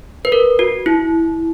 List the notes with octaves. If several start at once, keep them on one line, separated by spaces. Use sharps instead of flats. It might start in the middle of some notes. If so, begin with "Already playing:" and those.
B4
A#4
F#4
E4